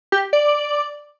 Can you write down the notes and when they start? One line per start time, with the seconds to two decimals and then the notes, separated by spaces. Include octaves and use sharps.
0.12 G4
0.33 D5